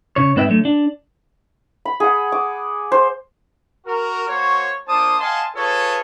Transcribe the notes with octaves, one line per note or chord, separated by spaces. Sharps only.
C#3 C#5
G#2 C4 B4 D#5 E5 G5
D3 F#3 A3
D4
B5
G#4 F#5
D6
C5
F#4 A#4
A#3 F#4 C5 C#5
A#3 D4 F4 C5 A5 D#6
D#5 F5 F#5 G#5 A5 C6
F4 G#4 A4 B4 C#5